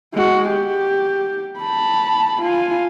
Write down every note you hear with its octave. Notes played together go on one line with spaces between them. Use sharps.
G#3 F#4
G4
A5 B5
F4 G#5